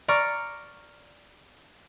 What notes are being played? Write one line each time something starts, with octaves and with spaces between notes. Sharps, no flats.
D5 A#5 C#6 F6